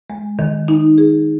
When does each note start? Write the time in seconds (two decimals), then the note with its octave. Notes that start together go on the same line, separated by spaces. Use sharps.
0.10 G#3
0.39 D#3
0.68 D#4
0.98 G#4